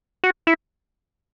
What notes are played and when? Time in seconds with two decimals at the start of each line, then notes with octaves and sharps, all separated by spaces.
0.24 F#4
0.47 E4